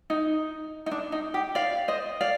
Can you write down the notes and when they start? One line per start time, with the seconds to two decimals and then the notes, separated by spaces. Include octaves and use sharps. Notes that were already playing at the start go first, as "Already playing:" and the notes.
0.10 D#4
0.86 D#4
0.91 D4
1.12 D#4
1.34 G4
1.55 D5 F5
1.88 C5 D#5
2.21 D5 F5